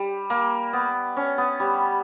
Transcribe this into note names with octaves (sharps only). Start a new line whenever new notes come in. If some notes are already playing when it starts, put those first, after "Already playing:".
Already playing: G3
A#3
B3
C#4
B3
G3